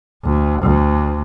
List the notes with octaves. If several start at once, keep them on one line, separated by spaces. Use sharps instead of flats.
D2
D2